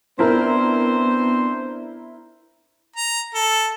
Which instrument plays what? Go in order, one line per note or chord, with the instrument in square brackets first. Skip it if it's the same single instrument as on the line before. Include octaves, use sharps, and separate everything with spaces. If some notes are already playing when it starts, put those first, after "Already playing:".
[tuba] B3 [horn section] C4 D4 C5 [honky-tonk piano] E4 A#4
[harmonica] A#5
A4